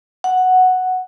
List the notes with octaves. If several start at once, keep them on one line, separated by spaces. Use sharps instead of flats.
F#5